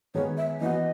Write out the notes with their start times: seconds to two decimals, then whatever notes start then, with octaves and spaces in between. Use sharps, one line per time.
0.15 D#3 G#3 B3 C#5
0.37 E5
0.61 E3 B3 F#4 D#5